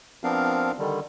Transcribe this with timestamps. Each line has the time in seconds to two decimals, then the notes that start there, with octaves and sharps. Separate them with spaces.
0.24 F3 B3 C4 D4 A#4 F5
0.79 D3 D#3 G3